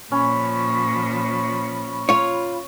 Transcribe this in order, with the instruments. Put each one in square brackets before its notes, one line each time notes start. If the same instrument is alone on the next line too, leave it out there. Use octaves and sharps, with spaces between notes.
[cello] A#2 F3 [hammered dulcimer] C#4 [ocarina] B5
[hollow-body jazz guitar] F4 C#5